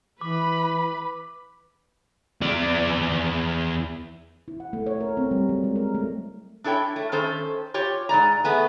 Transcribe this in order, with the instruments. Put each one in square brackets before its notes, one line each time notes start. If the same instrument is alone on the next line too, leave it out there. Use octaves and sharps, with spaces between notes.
[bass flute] E3 [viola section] B4 B5 [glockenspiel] D6
[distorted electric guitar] E2 D5
[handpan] E4
F#5
A3
C#5
A#4
C4
G3
F#3
G#3
A#4
A3
[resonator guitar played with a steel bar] D4 E4 A4 C#5 G5
A3
D#3 C#4 A4 C5
F4 G4 C#5
G#2 G#3 D5 A#5
A3 B3 G#4